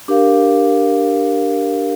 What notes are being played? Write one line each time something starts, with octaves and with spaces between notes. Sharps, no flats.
D4 G4 A#4 F5